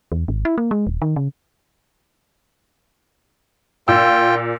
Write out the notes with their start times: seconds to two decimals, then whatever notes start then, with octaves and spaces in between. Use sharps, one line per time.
0.12 E2
0.28 G#1
0.45 E4
0.58 A#3
0.71 G#3
0.87 D#1
1.02 D#3
1.16 C#3
3.88 A#2 F4 G5 E6